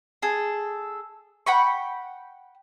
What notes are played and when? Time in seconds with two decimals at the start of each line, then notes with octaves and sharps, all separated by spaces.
0.22 G#4 A4
1.46 F#5 G5 B5 C#6